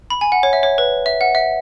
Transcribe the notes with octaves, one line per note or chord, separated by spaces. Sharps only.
B5
G#5
F#5
C#5
E5
C#5
B4
E5
F#5
E5